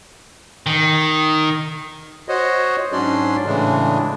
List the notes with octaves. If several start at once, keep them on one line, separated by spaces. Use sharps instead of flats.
D#3
F#4 C5 C#5 D#5
G#2 F#3 C#4 D4 D5 C6
A2 C#3 E3 G#3 D4